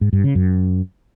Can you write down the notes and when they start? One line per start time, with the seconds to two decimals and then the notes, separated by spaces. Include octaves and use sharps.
0.01 G#2
0.13 G2
0.24 C#3
0.35 F#2